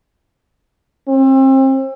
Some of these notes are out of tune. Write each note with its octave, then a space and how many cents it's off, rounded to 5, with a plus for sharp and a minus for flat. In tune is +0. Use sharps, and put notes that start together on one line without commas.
C4 +35